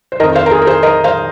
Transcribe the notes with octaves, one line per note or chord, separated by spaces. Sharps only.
C5
F2 D#3 A#4 D#5
C5 F5
A#4
G#4
A#4
G#4 C5
A#4 D#5
C5 F5